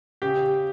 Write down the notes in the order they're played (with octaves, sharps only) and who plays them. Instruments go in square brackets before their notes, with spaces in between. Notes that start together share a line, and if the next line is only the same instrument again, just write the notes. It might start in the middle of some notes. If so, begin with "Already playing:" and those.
[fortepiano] C#3 G4